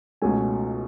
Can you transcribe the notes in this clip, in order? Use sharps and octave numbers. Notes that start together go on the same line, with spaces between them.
C#2 B2 A3 C#4 G#5